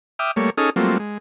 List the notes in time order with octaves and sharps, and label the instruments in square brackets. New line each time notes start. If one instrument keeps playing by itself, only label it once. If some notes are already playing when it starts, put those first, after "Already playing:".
[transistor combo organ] E5 G5 D6 D#6 F6
G3 A3 A#3 C#5
C#4 D#4 G#4 A4 D#6 F6
F#3 G3 A3 A#3 C4 F4
G#3